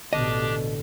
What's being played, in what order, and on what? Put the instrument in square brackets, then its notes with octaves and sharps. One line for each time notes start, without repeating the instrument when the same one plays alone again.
[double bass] A1 B2 [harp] D3 [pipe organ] D4 G4 [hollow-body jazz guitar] D#5